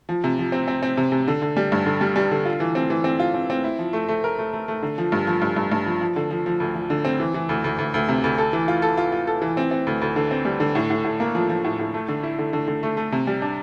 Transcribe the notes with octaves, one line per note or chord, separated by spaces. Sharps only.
F3
C3
F3
C4
C4
C4
C3
C3
D3
D3
G3
G2
D3
G3
G3
D3
F4
E3
C4
E3
C4
F4
C4
C4
E4
F3
A3
A3
A#4
A3
A3
A3
D3
F3
G2
F3
G2
G2
G2
F3
F3
D3
F3
F3
D2
F3
D3
C4
E3
E3
D2
D2
D2
D2
C3
D2
A4
E3
F4
A4
F4
F4
A4
E3
C4
C4
D2
D2
D3
C4
G3
D3
A2
A2
A2
A#3
F3
F3
A2
A2
A3
D3
E4
D3
D3
D3
A3
A3
C3
G3
D4